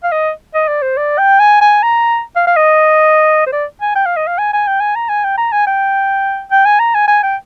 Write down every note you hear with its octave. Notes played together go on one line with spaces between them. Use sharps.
F5
D#5
D#5
D5
C5
D5
G5
G#5
G#5
A#5
F5
F5
D#5
C5
D5
G#5
G5
F5
D#5
F5
G#5
G#5
G5
G#5
A#5
G#5
G5
A#5
G#5
G5
G5
G#5
A#5
G#5
G#5
G5